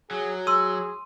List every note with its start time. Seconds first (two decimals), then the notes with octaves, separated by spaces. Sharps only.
0.11 F#3 G#4
0.47 G#4 C6 E6 D#7